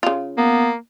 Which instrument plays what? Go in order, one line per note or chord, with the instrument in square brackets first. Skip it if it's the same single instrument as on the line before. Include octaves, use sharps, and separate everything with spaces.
[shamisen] C#3 F4
[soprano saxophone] A#3 [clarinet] B3